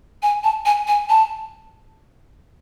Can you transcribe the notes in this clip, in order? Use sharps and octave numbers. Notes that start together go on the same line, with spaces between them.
G#5
A5
G#5
G#5
A5